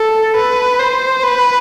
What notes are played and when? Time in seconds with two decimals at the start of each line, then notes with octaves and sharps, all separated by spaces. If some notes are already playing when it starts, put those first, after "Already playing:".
Already playing: A4
0.37 B4
0.80 C5
1.24 B4